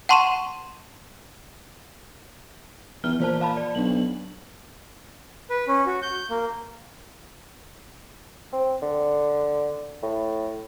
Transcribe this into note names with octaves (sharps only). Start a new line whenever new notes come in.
F#5 A5 C6 C#6 D#7 E7
E2 F3 F6 G7
A#2 E3 C5 A5
F5 A5 B5
D5
B1 D4 F#7
B4
C#4
F#4
G6
A#3
C4
D3
A2